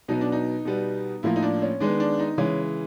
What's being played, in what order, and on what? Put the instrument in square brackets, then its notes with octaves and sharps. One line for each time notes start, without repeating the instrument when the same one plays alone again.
[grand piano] B2 F#3 B3 D#4
D4
D#4
B2 G3 B3
A2 F3 A#3 E4
D#4
D4
C#4
D#3 G#3 B3 D4
D4
D#4
C#3 E3 G#3 C#4